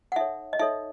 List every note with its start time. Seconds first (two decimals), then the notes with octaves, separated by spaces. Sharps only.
0.12 F#5
0.16 D#4 A4 C#5 E5
0.53 D#5
0.59 D#4 A4 C#5 E5